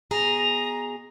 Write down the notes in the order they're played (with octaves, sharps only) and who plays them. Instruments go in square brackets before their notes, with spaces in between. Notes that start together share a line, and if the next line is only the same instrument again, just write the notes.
[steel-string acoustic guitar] B2 G#4 [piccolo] A#5